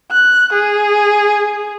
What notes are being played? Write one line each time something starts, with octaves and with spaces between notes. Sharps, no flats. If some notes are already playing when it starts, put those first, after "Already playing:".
F#6
G#4